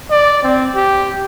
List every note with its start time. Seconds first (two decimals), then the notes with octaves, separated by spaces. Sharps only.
0.11 D5
0.43 C4
0.76 G4